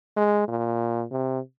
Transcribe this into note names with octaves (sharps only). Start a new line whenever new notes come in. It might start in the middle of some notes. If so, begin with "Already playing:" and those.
G#3
A#2
C3